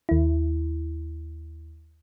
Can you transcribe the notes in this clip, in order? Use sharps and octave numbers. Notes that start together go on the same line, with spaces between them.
D#2 E4